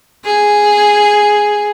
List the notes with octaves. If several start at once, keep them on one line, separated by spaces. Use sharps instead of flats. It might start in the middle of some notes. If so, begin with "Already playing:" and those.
G#4